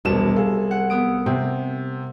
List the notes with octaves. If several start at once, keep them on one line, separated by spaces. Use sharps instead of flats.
E1 C2 B2 E7
G#4 A4 F5
F#5
B3 D#6 D7
C3 C4